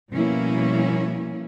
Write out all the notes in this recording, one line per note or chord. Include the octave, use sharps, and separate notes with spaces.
B2 F3 G3 A#3 C#4 E4